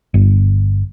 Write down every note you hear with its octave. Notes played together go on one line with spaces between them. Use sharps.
G1